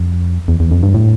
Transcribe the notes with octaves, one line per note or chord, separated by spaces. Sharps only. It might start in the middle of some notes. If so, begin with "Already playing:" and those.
Already playing: F2
E2
E2
F2
G2
A2